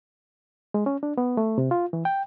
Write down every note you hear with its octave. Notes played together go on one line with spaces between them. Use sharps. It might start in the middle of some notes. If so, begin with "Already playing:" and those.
G#3
C#4
D4
B3
A3
C3
F4
E3
G5